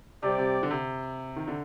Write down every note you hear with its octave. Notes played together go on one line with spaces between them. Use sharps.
C3 G3 C4 G4 D5
C3
D3
C3
D#3
D3